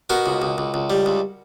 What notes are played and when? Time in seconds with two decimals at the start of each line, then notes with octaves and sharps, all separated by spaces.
0.10 B2 F#4 A#4
0.26 C#2
0.42 C#2
0.58 C#2
0.74 C#2
0.90 G3
1.06 C#2